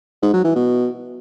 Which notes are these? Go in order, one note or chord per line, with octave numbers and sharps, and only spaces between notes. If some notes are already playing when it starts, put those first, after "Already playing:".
G#2
F#3
E3
B2